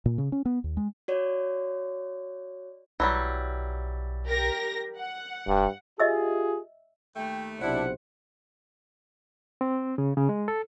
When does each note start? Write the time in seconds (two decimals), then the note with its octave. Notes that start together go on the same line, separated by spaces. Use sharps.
0.06 A#2
0.18 C#3
0.32 C#4
0.45 B3
0.64 D#2
0.77 G#3
1.08 F#4 C#5 D5
3.00 B1 E3 F#3 G3
4.26 G4 A#4 A#6
4.97 F#5
5.47 F1 G2
6.00 F4 G4 G#4 D#5 E5 E6
7.16 D#2 A3 G5
7.61 B1 C3 D4 E4 C5 F#5
9.61 C4
9.98 C#3
10.17 C#3
10.29 G#3
10.48 A4